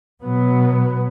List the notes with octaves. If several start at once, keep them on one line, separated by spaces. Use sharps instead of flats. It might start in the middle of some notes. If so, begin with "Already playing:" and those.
B2 F#3 B3